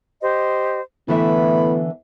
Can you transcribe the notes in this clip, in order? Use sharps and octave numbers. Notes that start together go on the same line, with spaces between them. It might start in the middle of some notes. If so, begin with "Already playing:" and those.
G4 C5 D#5
A2 D3 E3 B3 E5 B5